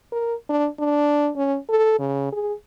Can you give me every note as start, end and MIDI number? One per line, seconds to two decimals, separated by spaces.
0.12 0.35 70
0.50 0.68 62
0.79 1.30 62
1.36 1.58 61
1.69 1.95 69
1.99 2.31 49
2.32 2.53 68